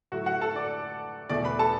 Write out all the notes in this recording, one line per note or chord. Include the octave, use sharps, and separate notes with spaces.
A2 F#3 A3 F#4 F#5
F#4 F#5
A4 A5
D5 D6
E2 B2 A3 D5 D6
B4 B5
A4 A5